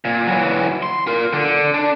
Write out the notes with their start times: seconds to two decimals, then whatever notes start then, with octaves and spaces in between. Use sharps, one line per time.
0.05 A#2
0.27 E3 F#3
0.83 C6
1.07 F4 A#4
1.33 D3
1.74 D4